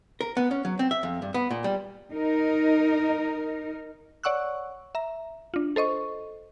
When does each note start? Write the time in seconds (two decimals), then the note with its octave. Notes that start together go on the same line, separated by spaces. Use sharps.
0.21 A#4
0.37 B3
0.51 C#4
0.65 F#3
0.79 C4
0.91 E5
1.03 F2
1.22 G2
1.34 B3
1.51 A#2
1.64 G3
2.12 D#4 A#4
4.24 C#5 D5 F#5 C#6 E6 F#6
4.95 E5 A#5
5.54 D4 F4
5.76 A4 C5 D#5 C#6